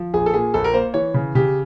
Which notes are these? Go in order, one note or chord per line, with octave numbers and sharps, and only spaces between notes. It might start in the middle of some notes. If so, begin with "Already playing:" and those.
Already playing: F3
A#1 G#4
A4
A#2 G#4
A#1 A4
A#4
A#3 C5
E3 C#5
C#3
C#3 G4